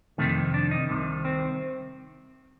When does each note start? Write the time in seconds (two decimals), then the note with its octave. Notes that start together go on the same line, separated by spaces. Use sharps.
0.18 F2 C3 D#3 A3
0.54 D4
0.71 D#4
0.89 C2 C3 D#3
1.25 C4